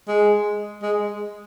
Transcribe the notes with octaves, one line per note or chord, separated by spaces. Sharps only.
G#3
G#3